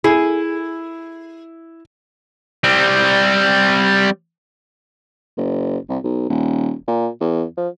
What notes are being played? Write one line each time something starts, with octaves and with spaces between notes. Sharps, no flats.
E4 G#4
G3 C4
F#1
C2
B1
D#1
A#2
E2
F3